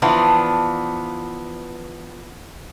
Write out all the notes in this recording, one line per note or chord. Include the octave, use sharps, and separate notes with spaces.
E3 F3 B3 D4